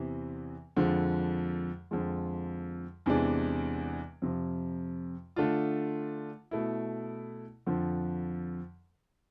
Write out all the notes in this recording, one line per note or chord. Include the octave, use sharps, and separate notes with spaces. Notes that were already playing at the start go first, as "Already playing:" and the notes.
Already playing: E2 C3 E3
F2 D3 F3 G#3
F2 D3 F3 G#3
E2 C3 E3 G#3 D4
F2 C3 F3
D3 A3 D4 F4
B2 A3 E4
F2 D3 F3